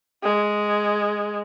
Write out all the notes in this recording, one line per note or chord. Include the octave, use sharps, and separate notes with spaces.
G#3